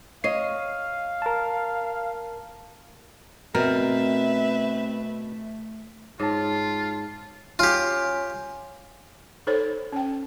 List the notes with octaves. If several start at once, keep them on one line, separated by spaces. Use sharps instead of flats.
C#5 D#5 F5 C7
A#4 A5
B2 A3 C4 A#4 B4 E5
G#2 F4 C#5 A5
C#4 F4 G4
D#4 A4 C5 C#5
C#4 G5